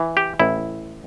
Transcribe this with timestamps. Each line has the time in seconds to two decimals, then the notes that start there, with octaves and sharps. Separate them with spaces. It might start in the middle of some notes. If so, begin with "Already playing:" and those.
Already playing: E3
0.17 G4
0.40 A1 E4